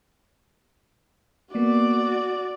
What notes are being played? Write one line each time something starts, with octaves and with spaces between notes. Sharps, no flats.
A#3 B3 F#4 D5